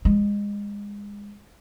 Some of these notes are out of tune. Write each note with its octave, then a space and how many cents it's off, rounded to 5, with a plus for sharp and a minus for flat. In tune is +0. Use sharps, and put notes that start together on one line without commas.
G#3 -25